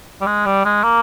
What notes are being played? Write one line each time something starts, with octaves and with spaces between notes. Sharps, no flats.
G3
G#3
G3
G#3
A#3